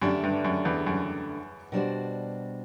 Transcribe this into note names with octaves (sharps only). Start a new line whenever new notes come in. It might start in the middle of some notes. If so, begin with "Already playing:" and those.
F#2 D3 A3 D4 G4
G2
F#2
E2
F#2
B2 G3 D4 F#4 C5